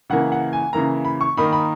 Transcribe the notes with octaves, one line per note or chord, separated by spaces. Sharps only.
C#3 E3 A#3 F#5
F#5
G#5
C#3 E3 A#3 A#5
B5
C#6
D#3 A#3 D#4 B5
B5